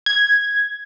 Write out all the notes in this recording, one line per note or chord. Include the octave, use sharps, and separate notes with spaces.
G#6